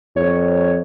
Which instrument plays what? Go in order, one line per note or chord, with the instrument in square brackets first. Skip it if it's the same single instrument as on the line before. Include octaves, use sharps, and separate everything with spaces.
[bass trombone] F2 [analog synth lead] C#5